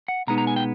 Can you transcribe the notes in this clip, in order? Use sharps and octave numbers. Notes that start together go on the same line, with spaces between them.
F#5
B2 G#3 B3 D#4 A#5
A#5
G#5
G5